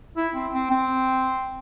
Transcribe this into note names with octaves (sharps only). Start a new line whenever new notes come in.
E4
C4
C4
C4